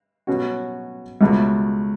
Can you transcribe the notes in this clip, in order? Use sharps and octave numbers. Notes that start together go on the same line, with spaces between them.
B2 F#3 C#4 F#4
C#2 B2 A3